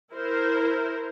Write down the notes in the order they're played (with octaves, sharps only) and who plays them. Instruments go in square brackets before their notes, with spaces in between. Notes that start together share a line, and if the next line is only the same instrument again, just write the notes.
[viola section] E4 A#4 C5